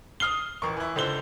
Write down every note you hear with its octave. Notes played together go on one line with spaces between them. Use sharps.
D#6 F6 C7 G7
A1 A#4 C#6
E3 E4
C#2 D3 C5 G7